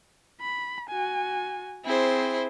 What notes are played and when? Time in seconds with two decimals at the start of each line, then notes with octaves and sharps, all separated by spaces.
0.41 B5
0.89 F#4 G#5
1.85 C4 E4 G#4 C5